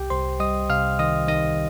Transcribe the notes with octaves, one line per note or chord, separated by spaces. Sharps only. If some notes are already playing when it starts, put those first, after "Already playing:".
Already playing: C2 G4 G5
C2 C5 C6
G3 D#5 D#6
C3 F5 F6
D#3 D#5 D#6
D#3 D#5 D#6